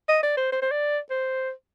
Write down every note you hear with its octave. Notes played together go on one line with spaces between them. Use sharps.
D#5
D5
C5
C5
C5
D5
C5